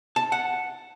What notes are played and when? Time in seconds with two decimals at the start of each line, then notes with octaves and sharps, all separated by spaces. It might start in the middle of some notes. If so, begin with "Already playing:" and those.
0.16 A5
0.32 F#5